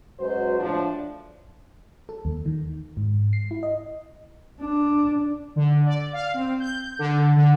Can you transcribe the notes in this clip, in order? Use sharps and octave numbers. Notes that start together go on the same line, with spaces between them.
F#2 F#3 G#3 F#4 B4 C5
A2 F3 D4
A4
D#2
D#3
G#2
C7
E4
D#5
D4
D3
D5
F5
C4
G6
D3
D3